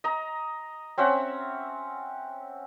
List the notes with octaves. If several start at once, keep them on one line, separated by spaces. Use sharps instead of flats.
D#5 A#5
C4 C#4 E5 F#5